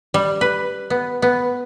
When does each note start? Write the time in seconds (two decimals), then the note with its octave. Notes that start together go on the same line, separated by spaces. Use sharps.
0.14 G3
0.41 B4
0.90 B3
1.22 B3